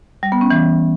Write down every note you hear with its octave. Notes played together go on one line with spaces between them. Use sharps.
G3
B3
C#4
E3